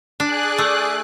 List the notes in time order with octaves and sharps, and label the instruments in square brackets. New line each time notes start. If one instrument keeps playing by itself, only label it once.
[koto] D4 [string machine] G#4 D5 F#6
[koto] A3